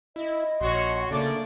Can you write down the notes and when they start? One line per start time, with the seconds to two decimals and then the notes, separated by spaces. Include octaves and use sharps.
0.16 E4 D#5
0.61 A#1 F#4 C#5 C6
1.11 C#3 A3 A#3 D4 D5